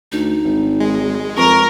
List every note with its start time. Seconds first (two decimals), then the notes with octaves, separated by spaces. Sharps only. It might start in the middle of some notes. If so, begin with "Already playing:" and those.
0.12 D2 D#4
0.45 G#1
0.80 G#3
1.37 F2 A#4 C#6